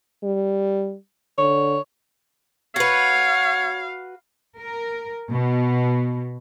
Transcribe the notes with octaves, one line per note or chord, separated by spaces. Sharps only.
G3
D3 C#5
F#4 B4 C#5 F5
A#4
B2